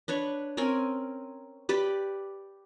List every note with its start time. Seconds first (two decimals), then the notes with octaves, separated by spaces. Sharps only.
0.08 D4 B4 C#5 C#6
0.57 C4 C#4 A#4 G#5
1.69 G4 B4 D5